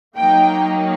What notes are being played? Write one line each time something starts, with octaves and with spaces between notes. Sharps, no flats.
F#3 A#3 D#4 G5